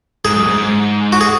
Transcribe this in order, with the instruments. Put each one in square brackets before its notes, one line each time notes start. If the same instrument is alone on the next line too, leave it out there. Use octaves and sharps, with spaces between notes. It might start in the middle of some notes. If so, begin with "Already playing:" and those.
[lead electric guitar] G#2 [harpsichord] G#4
[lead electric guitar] F#2
G#2
G#2
[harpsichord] F#4
G#4